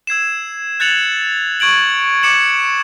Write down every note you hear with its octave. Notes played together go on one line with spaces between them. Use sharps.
E6 G#6 C7 E7
F#6 G#6 A6 C#7 F7 F#7
C#6 G#6 D7 F#7
D6 C#7 E7 F#7